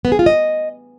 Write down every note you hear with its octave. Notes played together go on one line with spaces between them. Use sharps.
B3
G#4
F4
D#5